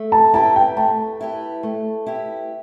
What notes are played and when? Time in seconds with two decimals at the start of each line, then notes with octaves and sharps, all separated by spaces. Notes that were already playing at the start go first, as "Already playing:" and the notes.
Already playing: A3
0.12 A5
0.34 E4 G4 B4 A5
0.56 G5
0.77 A3 A5
1.21 E4 G4 B4
1.63 A3
2.06 E4 G4 B4